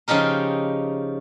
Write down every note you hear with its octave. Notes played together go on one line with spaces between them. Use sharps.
C#3 F3 D#4 G4 A#4